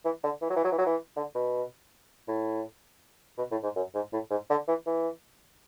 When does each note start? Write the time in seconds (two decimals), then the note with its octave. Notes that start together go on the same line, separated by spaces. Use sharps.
0.05 E3
0.24 D3
0.42 E3
0.50 F#3
0.56 E3
0.64 F#3
0.72 E3
0.78 F#3
0.86 E3
1.16 D3
1.35 B2
2.28 A2
3.38 B2
3.51 A2
3.63 G#2
3.76 F#2
3.95 G#2
4.13 A2
4.30 G#2
4.50 D3
4.68 E3
4.86 E3